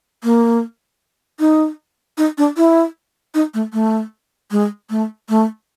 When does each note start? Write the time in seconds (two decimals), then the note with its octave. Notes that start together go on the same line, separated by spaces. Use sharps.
0.24 A#3
1.40 D#4
2.18 D#4
2.38 D4
2.57 E4
3.35 D#4
3.54 A3
3.73 A3
4.51 G#3
4.90 A3
5.29 A3